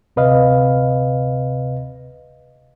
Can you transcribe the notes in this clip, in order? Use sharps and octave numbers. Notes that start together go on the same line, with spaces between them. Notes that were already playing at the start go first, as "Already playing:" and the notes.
D2 C3 B4 D#5 F5